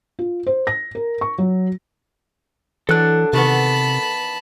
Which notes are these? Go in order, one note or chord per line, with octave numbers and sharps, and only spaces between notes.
F4
C5
A#6
A#4
C#6
F#3
E3 F#3 D4 A4 F#6
C3 D#3 E3 B3 A5 B5